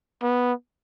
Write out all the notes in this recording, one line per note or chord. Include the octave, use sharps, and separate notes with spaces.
B3